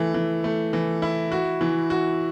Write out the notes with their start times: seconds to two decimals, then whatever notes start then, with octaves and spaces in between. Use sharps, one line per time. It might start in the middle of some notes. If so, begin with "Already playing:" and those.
Already playing: E3 A3
0.14 E3
0.44 A3
0.73 E3
1.02 E4
1.32 F#4
1.61 E3
1.90 F#4